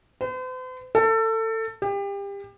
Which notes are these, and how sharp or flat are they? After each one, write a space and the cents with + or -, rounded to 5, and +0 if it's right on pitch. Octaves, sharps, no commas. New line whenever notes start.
C5 -45
A4 +25
G4 +30